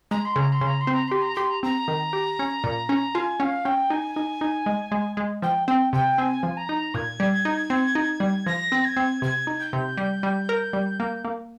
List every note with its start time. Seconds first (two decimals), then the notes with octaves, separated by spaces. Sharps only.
0.10 G#3 A#5
0.25 C6
0.36 C#3 A#5
0.52 C6
0.61 C#3 A#5
0.80 C6
0.87 C4
0.93 A#5
1.07 G4 C6
1.21 A#5
1.35 G4 C6
1.49 A#5
1.63 C4 A#5
1.88 D#3
2.13 G4
2.39 C#4
2.64 A#2
2.89 C#4
3.14 F4 G#5
3.40 C#4 F5
3.65 C#4 G5
3.90 D#4 G#5
4.16 D#4
4.41 D#4
4.66 G#3
4.91 G#3
5.17 G#3
5.42 F3 G5
5.67 C4 G5
5.93 C3 G5
6.18 C4 G#5
6.43 F3
6.56 A#5
6.69 D#4
6.94 A#2 G#6
7.20 G3
7.45 D#4
7.70 C4
7.95 D#4
8.20 G3
8.46 F3 A#6
8.72 C4
8.84 G#6
8.97 C4
9.22 C3 G#6
9.47 D#4
9.60 G6
9.73 C3
9.98 G3
10.23 G3
10.49 A#4
10.73 G3
11.00 A#3
11.25 A#3